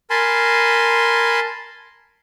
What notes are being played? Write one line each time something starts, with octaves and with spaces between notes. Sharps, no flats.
A#4 G#5 A5 B5 C6